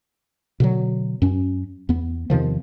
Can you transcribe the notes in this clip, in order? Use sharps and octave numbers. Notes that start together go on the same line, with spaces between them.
B2 D3 F#3
F#2 C#4
E2 B3
E2 C3 D#3 F3